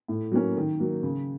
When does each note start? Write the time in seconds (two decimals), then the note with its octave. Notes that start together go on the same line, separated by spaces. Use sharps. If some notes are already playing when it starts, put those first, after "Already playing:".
0.08 A2
0.32 F#3 A#3 C#4
0.56 D#3
0.79 F#3 A#3
1.03 C#3